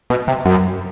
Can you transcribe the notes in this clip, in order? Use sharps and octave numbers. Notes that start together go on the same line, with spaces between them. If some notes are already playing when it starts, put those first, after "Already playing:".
B2
C3
F#2